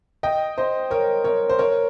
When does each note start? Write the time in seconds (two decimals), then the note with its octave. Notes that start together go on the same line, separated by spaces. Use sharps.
0.23 D#5 G5
0.58 C5 D#5
0.91 A#4 C#5
1.24 A#4 C#5
1.50 C5
1.59 A#4 C#5